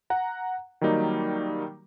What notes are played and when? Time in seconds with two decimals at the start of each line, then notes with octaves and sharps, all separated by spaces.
0.10 F#5 A#5
0.81 D#3 F#3 G3 A#3 D#4